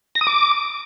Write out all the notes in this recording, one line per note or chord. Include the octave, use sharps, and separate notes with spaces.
A#6
D#6
D6